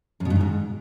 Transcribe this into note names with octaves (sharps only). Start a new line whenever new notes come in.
F#2
B2
G2
D#3
G#2